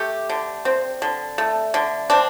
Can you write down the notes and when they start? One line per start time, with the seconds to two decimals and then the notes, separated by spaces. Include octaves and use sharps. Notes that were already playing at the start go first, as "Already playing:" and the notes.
Already playing: A3 G4
0.29 D3
0.65 C4
1.02 D3
1.38 A3
1.74 D3
2.10 C4 D4